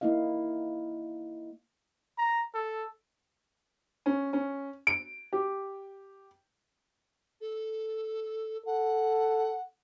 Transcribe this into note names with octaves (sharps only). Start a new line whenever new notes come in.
A#3 D#4 E4 D#5 F5
A#5
A4
C#4
C#4
D7
G4
A4
A4 F#5